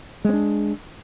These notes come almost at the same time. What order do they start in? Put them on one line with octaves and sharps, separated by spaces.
G#3 C4 D4